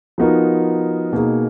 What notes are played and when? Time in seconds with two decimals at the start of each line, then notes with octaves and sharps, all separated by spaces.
0.18 F3 B3 D#4 F#4 A#4
1.13 B2 A#3 D#4 G#4